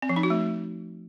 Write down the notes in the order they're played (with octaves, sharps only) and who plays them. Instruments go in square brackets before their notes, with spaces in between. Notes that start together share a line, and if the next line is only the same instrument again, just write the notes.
[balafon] C4
F3
D#4
F#4
A3